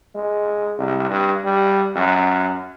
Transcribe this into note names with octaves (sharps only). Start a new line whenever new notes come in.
G#3
C2
G2
G3
F#2